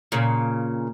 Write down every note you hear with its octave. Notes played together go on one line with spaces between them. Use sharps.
A#2 C#3